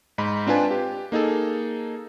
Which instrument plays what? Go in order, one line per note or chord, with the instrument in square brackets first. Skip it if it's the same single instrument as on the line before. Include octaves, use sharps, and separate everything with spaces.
[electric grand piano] G#2 D#4 B5
C4 D4 F4 B4 G#5 A5
G4
A#3 D#4 G#4 A4